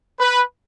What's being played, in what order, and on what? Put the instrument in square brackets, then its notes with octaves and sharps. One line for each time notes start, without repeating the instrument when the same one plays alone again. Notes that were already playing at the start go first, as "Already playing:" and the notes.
[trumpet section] B4